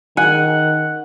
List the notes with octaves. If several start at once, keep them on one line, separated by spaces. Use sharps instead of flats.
D#3 F#5 G#5